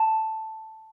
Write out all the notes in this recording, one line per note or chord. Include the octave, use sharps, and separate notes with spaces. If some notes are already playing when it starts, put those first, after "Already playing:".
Already playing: A5